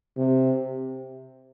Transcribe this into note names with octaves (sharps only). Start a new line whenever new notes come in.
C3